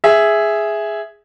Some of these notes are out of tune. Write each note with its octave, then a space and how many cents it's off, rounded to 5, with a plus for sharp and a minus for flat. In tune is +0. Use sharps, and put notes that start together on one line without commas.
G#4 +0 E5 +0